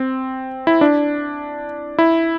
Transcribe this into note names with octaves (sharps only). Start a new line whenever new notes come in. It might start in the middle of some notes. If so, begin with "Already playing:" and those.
Already playing: C4
E4
D4
E4